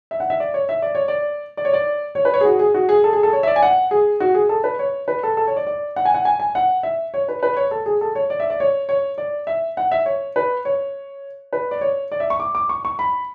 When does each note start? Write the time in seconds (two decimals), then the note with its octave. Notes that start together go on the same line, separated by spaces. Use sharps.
0.11 E5
0.20 F#5
0.30 E5
0.40 D5
0.54 C#5
0.69 E5
0.82 D5
0.95 C#5
1.08 D5
1.57 D5
1.65 C#5
1.73 D5
2.15 C#5
2.25 B4
2.34 C#5
2.41 G#4
2.45 F#4
2.59 G#4
2.74 F#4
2.89 G#4
3.04 A4
3.13 G#4
3.23 A4
3.33 C#5
3.43 E5
3.47 D5
3.56 G#5
3.62 F#5
3.91 G#4
4.20 F#4
4.34 G#4
4.49 A4
4.64 B4
4.79 C#5
5.08 B4
5.23 A4
5.37 A4
5.47 C#5
5.56 D5
5.67 D5
5.96 F#5
6.05 G#5
6.14 F#5
6.25 G#5
6.40 G#5
6.55 F#5
6.83 E5
7.14 C#5
7.28 B4
7.43 B4
7.57 C#5
7.71 A4
7.86 G#4
8.01 A4
8.15 C#5
8.30 D5
8.40 E5
8.50 D5
8.60 C#5
8.89 C#5
9.18 D5
9.47 E5
9.77 F#5
9.92 E5
10.06 C#5
10.36 B4
10.65 C#5
11.53 B4
11.71 D5
11.81 C#5
12.12 D5
12.20 E5
12.30 C#6
12.40 D6
12.55 D6
12.69 C#6
12.85 C#6
12.99 B5